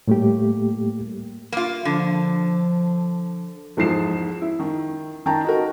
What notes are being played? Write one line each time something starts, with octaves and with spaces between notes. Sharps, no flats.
A2 G3 A3 A#3 G4
A#3 F4
D3 F3
E2 G#2 F3 C7 E7
E4
D#3
D#3 G5 A5 A#5
D#4 F#4 A#4